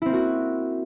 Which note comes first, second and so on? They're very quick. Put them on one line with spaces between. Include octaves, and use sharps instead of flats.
E4 C4 A#3 F#4